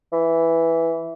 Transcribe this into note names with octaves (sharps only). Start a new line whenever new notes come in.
E3